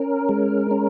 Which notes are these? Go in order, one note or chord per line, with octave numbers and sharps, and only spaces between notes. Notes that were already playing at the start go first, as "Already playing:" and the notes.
Already playing: C#4 A#4
G#3
C#4